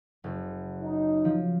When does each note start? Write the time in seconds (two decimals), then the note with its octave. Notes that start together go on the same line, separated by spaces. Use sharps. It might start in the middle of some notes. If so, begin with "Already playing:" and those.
0.24 F#1
0.83 D#4
1.25 F3